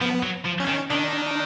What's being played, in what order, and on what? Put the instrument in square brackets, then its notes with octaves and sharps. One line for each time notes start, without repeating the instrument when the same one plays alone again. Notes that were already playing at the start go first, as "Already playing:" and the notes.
[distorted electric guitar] F3 [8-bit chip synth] B3
[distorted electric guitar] F#3
F3
[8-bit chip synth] C#4
[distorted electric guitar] D#3
[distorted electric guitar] D#3 [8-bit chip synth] D4